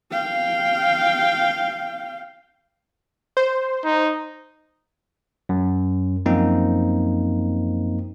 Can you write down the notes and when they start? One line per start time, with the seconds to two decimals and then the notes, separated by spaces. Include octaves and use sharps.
0.11 F5 G5
3.37 C5
3.84 D#4
5.49 F#2
6.26 F#2 F3 A#3 C4 D#4